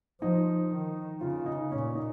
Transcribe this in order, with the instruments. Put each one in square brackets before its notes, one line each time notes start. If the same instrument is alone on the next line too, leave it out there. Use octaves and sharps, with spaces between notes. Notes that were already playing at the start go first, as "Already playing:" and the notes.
[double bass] F3 [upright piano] D#4
[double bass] D#3
[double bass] C#3 [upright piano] F4
[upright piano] D#4
[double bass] A#2 [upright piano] C#4
[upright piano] D#4